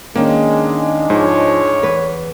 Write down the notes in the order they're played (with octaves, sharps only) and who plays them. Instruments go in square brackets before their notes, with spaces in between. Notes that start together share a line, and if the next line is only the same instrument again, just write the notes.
[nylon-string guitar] D#3 C#4 [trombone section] G#3 D4 [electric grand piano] A#3
[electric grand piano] G#2 [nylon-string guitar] F3 [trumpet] C#5
[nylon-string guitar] E2 B4